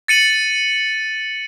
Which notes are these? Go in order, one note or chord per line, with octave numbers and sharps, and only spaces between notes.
A6 C#7 D#7 F#7